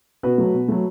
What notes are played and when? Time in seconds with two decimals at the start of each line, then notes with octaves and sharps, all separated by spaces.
0.23 B2 F#4 B4
0.38 F#3 A3
0.53 B2
0.68 F#3 A3